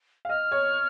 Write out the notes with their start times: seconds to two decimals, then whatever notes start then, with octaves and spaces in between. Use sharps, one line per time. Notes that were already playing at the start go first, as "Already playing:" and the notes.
0.25 F5
0.29 D#5 F6
0.52 C#5